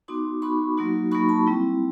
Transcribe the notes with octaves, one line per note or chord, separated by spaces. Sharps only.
B3 D#4 F#4 C6 D6
B3 D#4 F#4 B5 C#6
F#3 A#3 D#4 F#4
F#3 A#3 D#4 F#4 B5 C#6
A5 B5
G3 C4 E4